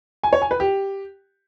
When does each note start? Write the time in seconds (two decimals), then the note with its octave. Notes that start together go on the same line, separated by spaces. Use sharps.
0.23 G#5
0.33 C#5
0.42 G#5
0.51 B4
0.60 G4